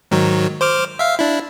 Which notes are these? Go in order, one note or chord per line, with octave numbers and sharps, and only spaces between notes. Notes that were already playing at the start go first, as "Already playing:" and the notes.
G#2 D#3 F#3
C5 D6 F6
E5 F5
D4 E4